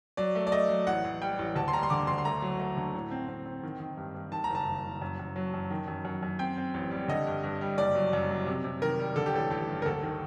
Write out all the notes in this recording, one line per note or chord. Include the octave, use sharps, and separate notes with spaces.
F#3 D5
A3
D5
A3 D#5
F#3
A1 F#5
A1
G3 G5
A1
D2 A5
C6
G3 A#5
C6
D3 D6
D2 C6
C6
A3 A#5
F#3
A3
D3
A2
C4
C4
C4
D#3
D#3
G2
G2
D#3 A5
A#5
F#1
A5
F#1
F#1
F#2
F#2
F#3
F#2
D#3
F#2
F#2
F#2
C4 G5
C4
A1
G3
D3 D#5
G2
G2
G3
F#1 D5
F#3
F#2
F#3
C3
C3
D#3 A#4
G3
D3 A4
G4
A1 A4
A1 G4
G2
A#4
D2 A4
D#3